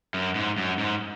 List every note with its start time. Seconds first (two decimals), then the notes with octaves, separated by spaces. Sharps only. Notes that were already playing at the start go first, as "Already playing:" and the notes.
0.14 F#2
0.35 G#2
0.58 F#2
0.79 G#2